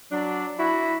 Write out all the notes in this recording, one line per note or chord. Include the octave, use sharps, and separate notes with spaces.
F#3 D4
E4 F#4